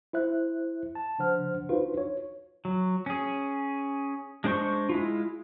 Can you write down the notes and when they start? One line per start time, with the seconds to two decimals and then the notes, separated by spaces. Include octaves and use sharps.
0.13 E4 C5 E5 F#6
0.95 A5
1.18 C#3 F3 D4 C5 F#5 F6
1.69 D4 D#4 F4 F#4 B4 C5
1.98 C#5
2.65 F#3
3.06 C#4 G#4
4.44 G#3 D4 C5 C6 C#6
4.89 G#3 E4 F4